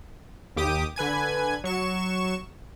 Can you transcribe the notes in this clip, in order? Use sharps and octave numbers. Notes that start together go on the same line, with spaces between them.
D#2 G4 D6 D#6
D3 B4 G#5 G#6
F#3 C#6 E7